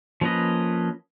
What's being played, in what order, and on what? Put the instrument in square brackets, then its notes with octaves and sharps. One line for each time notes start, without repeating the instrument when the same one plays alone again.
[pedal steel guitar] F3 A#3 C#4 B4 D#5